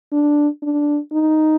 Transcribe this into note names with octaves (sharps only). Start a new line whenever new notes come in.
D4
D4
D#4